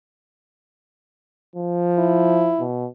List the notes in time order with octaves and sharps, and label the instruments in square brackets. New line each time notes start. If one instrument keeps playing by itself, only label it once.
[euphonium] F3
[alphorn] E4
[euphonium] B2